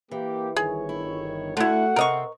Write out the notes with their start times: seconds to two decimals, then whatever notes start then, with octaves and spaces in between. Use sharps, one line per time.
0.11 E3 A#3 G4
0.56 G1 D#3 G#4 C#5
0.89 E4
1.57 D3 A3 E4 F#4 F#5
1.96 C3 C4 A#4 D#5 C#6